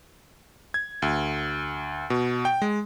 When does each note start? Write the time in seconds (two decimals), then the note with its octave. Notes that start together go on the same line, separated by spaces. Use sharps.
0.74 G#6
1.02 D2
2.10 B2
2.45 G5
2.62 G#3